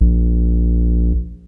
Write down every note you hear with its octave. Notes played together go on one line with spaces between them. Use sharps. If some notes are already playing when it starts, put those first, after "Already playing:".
A#1